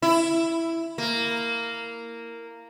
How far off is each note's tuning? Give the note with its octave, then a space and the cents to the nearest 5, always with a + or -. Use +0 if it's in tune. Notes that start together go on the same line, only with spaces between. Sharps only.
E4 +5
A#3 -10